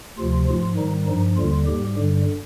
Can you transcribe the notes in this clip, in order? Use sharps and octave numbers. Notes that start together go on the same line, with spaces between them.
D2 C3 F3 F4
G#2 F3 F4
G#2 D#3 G3 D#4
G2 F3 D#4
D#2 D3 G3 F4
G#2 G3 G4
G2 D3 G3